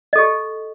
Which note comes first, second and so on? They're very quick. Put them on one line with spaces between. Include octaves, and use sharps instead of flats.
D#5 A4 G4